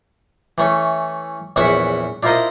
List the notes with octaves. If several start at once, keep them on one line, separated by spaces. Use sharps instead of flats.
E3 A3 C#4
A#1 E2 C#4 B4 E5 F#5
D4 E4 F4 A#4 C5 D#5